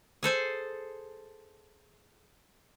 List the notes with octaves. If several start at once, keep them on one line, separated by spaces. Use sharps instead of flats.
G#4 A4 C5 G#5